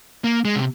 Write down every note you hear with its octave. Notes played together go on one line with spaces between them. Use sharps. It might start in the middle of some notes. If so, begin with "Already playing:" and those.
A#3
G#3
C3